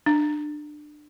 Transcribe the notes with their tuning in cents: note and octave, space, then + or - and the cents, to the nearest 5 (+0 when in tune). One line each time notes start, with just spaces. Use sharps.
D4 +25